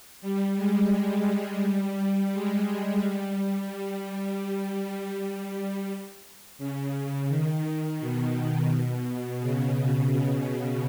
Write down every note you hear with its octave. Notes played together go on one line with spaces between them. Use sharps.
G3
G#3
G3
G#3
G3
G3
G3
G3
G3
C#3
C#3
D#3
B2
C#3